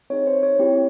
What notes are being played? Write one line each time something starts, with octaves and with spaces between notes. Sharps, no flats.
C4 D#4 G#4 C#5
C5
C#5
C4 E4 G4